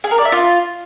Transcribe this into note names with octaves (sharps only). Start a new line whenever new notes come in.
G#4
A#4
D5
E5
F4